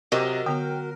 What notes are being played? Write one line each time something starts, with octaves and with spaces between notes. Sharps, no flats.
C3 F#3 A#4 D#5 C#6 D6
D3 B3 F#4 G5